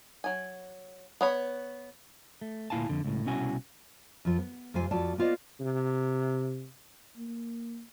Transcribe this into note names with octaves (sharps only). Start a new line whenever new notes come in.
F#3 G#5
B3 C#5 B5
A3
D2 A#2 E4 F5 G#5 A5
F2 D3
C#2 A2
C2 B2 C#4 E4 F#4 G#5
F2 F3
B3
F2 C3 F4 C5 G#5
F2 F4 F#4 D5 A5
A#3 B3 F4 C5 D5 D#5
C3
A#3